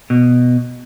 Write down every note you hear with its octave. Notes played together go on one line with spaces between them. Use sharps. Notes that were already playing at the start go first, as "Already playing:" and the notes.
B2